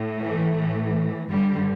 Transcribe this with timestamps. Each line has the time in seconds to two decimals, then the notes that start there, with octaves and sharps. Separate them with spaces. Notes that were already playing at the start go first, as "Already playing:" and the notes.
Already playing: A2
0.18 E3 A3
0.56 A2 E3
1.30 G2 D3 G3